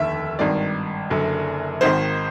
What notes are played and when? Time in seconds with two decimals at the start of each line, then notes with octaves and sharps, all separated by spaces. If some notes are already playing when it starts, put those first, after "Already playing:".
Already playing: F1 D#2 D3 E5
0.39 G#1 G2 D#3 D5
1.10 F#1 F#2 D3
1.81 G#1 G#2 D#3 C5